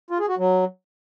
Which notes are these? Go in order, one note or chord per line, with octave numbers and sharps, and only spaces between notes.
F4
G#4
F#4
F#3